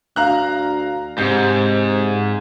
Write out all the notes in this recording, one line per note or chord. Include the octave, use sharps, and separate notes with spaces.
D2 F5 A#5 F#6
G#2 C3 G6